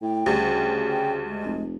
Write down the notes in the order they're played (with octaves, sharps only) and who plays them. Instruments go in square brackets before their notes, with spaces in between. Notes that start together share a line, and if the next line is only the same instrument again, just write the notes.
[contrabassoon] A2 [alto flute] G5
[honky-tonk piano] D2 G3 [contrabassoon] C#3
[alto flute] G5
G#3
[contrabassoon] F1